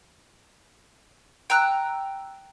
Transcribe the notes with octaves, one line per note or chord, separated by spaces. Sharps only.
G5 A#5 E6 F#6